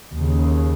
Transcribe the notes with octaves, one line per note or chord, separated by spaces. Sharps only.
D#2 C#3